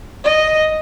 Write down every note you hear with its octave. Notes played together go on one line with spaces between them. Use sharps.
D#5